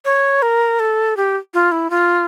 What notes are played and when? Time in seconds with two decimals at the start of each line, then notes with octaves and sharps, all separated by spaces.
0.05 C#5
0.42 A#4
0.80 A4
1.17 G4
1.54 F4
1.72 E4
1.90 F4